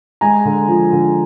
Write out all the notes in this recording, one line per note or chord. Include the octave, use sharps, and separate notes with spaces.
G#3 G#5 A#5
D3
F3
D3